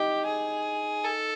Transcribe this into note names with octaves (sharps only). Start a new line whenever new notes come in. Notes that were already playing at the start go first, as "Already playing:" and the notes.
Already playing: D#4 G4
G#4
A4